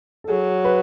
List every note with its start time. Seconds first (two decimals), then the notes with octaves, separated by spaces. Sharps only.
0.24 A4
0.29 F#3 G#4
0.65 B4